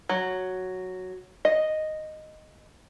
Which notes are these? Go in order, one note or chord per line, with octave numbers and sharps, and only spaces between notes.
F#3
D#5